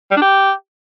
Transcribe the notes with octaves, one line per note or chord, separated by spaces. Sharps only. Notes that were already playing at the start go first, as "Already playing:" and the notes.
G3
D4
G4